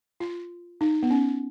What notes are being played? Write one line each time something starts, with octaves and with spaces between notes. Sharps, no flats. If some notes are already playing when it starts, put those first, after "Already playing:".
F4
D#4
B3
C#4